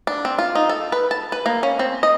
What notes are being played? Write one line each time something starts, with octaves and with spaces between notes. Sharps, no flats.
D4
C4
F4
D#4
A4
B4
A5
B4
A#3
C#4
C4
D#5